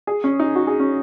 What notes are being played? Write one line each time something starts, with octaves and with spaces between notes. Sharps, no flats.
G#4
C#4
D#4
F#4
G#4
C#4